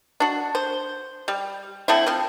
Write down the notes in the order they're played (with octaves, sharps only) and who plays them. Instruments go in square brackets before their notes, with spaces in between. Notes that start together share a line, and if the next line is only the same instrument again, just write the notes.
[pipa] D4 F#4
C5
G3
D3 A3 C4 E4
F3 C4